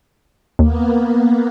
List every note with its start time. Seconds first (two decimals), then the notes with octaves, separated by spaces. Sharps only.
0.59 D#2 A#3 B3